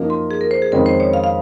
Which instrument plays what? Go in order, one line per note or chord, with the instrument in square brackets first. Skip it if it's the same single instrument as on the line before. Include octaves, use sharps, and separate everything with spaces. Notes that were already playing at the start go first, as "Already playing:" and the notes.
Already playing: [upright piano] F#2 F3 A#3 D#4
[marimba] C6
G#4
A#4
C5
G#4
[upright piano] F2 D#3 G#3 C#4 [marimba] A#4
[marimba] C5
C#5
F5
F5